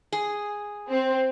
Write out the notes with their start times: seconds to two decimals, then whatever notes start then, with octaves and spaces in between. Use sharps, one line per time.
0.12 G#4
0.90 C4